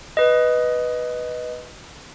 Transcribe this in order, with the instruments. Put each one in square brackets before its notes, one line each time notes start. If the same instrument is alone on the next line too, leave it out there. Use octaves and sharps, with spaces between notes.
[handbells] B4 D#5